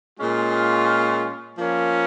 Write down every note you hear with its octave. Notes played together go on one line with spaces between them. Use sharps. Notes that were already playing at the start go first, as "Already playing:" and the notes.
A#2 G#3 C#4 F4
F3 A#3 C#4